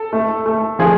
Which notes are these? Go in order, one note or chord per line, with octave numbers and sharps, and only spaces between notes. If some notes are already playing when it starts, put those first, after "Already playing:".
Already playing: A4
A3
A3
F3 G#4